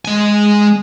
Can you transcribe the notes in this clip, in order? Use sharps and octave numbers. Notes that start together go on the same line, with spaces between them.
G#3 G#5